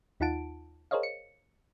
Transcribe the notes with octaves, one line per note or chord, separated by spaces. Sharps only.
D#2 D#4 F4 F#5 A5 D7
G#4 A#4 C5 C#5 D#5 F5
C#7